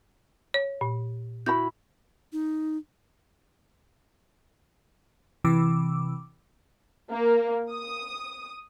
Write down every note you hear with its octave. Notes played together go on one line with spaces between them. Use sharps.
C#5
A#2
E4 F#4 B5 G6
D#4
C3 E3 D6 E6
A#3
D#6